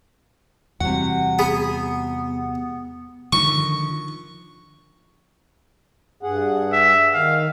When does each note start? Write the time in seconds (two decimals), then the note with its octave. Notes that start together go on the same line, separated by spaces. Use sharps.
0.80 E2 C3 G3 F#4 F#5
1.39 B3 G#4 B5
3.33 D3 D#3 F3 C#6
6.23 G2 G#4 F#5
6.72 E5
7.14 D#3 F5